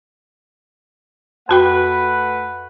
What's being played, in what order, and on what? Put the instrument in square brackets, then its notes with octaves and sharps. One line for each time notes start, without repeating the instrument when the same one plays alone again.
[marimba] F2 F#4 G5 [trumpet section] A3 B4 F#5